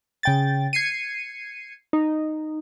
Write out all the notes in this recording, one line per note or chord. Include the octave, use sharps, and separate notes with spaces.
C#3 G5 A6
G#6 C7 C#7 D#7
D#4